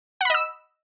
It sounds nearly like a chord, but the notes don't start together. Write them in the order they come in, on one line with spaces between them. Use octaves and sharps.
F#5 B5 D#5 E6